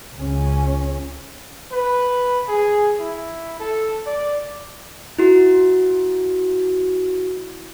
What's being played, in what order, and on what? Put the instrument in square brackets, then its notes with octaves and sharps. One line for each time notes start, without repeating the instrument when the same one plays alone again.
[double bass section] C#2 C#4
[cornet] B4
G#4
E4
A4
D5
[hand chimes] E4 F#4